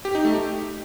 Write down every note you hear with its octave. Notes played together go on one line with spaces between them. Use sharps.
G4
D#4
A3
G4